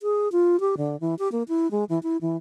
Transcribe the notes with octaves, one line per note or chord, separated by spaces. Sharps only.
G#4
F4
G4
D3
E3
G4
A#3
E4
G#3
E3
E4
E3